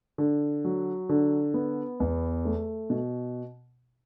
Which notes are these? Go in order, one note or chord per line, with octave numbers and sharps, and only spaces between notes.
D3
F#3
D3
B3
E2
A3
B2